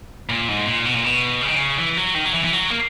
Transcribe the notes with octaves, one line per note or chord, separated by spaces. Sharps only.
A#2
G#2
A#2
B2
A#2
B2
C#3
D#3
C#3
E3
F#3
D#3
F#3
E3
E3
F#3
A#3